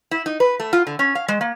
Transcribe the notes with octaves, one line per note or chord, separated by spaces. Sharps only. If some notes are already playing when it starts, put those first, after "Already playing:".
E4
D#4
B4
A3
F4
D3
C#4
F5
G#3
A#3